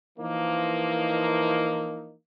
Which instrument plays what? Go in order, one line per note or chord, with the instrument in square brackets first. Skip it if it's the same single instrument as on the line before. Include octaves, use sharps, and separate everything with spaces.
[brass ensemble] E3 F3 A#3 D#4